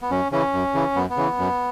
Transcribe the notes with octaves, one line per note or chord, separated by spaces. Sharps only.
B3
F#2 C#4
C#3 E3 C#4
F#2
C#3 E3
F#2 B3
B3
C#3 E3
F#2